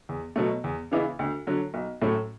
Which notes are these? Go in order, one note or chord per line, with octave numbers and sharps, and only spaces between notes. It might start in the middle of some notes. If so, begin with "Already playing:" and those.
E2
B2 F#3 A3
E2
C#3 E3 B3 E4
D2
D3 F#3
B1
A2 F#3 A3 C#4